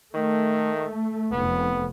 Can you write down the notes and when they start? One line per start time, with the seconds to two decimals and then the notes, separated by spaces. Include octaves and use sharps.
0.14 D#3 A3
1.32 F1 F2 B3